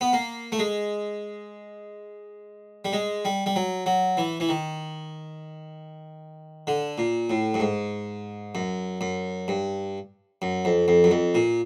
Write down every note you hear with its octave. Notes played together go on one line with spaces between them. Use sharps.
B3
A#3
A3
G#3
G3
G#3
G3
G3
F#3
F#3
E3
E3
D#3
D3
A#2
A2
G2
G#2
F#2
F#2
G2
F#2
F2
F2
F#2
F2
A#2